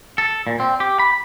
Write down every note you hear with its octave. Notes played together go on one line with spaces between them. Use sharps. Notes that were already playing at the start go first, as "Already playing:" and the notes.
A4
A#2
C4
G4
B5